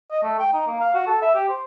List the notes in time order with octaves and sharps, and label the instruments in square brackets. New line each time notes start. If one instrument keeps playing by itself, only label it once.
[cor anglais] D#5
A3
G5
D#4
A#3
F5
F#4
A4
E5
G4
C5